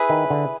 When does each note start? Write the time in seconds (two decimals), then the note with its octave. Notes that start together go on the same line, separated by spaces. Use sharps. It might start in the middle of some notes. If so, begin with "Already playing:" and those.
Already playing: E4 G#4 B4 E5
0.09 D#3
0.30 D3